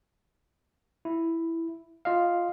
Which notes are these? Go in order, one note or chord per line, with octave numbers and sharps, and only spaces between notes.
E4
F4 D#5 F5